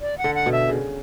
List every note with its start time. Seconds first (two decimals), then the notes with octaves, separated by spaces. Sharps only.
0.01 D5
0.18 F#5
0.24 D3
0.35 F#5
0.46 B2
0.52 E5
0.69 C#3